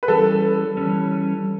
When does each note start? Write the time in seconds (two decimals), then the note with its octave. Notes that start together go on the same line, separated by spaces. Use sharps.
0.03 B4
0.08 E3 G3 C#4 A4
0.77 E3 G3 C#4